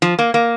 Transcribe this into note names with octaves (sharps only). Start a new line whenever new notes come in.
F3
A#3
A#3